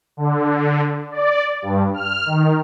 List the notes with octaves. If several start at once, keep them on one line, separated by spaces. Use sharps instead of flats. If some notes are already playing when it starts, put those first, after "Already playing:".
D3
D5
G2
F6
D#3